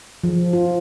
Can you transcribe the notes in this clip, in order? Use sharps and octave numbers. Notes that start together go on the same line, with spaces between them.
F3
F4